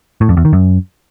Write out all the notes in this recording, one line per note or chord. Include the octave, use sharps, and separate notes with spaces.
A2
F2
E2
D#3
F#2